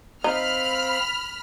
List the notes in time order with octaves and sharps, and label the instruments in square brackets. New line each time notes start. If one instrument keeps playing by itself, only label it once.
[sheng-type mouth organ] C4 F5 [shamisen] D#4 [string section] B5 F6